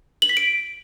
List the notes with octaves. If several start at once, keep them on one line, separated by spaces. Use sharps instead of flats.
F#7
B6
D7